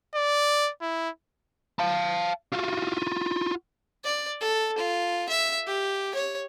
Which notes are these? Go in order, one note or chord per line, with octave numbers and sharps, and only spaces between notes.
D5
E4
F5 A5
F4 F#4
D5
A4
F4
E5
G4
C#5